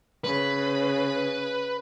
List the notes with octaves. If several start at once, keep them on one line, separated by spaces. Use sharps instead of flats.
C#3 B4